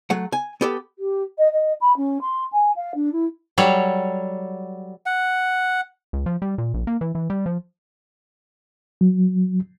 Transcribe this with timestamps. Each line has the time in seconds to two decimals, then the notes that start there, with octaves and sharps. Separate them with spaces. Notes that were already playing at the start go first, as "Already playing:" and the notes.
0.10 F#3 A3 F#5
0.32 G#5
0.61 B3 G4 A4
0.98 G4
1.38 D#5
1.52 D#5
1.80 B5
1.96 C#4
2.21 C6
2.52 G#5
2.75 F5
2.94 D4
3.12 E4
3.58 F#3 G3 A4 C#5
5.06 F#5
6.13 C#2
6.26 F3
6.42 G3
6.58 A#2
6.74 A#1
6.87 A#3
7.01 E3
7.15 E3
7.30 G3
7.46 F3
9.01 F#3